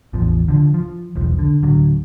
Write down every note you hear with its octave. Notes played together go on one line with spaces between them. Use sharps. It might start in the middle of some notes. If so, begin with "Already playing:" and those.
A1 E2 F3
D3 F3
F3
E1 B1 F3
D3
D1 D3 F#3